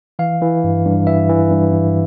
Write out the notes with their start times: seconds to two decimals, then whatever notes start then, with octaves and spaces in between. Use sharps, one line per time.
0.19 E3 F5
0.42 E3
0.64 G2
0.86 G2
1.07 E3 E5
1.29 E3
1.51 G2
1.72 G2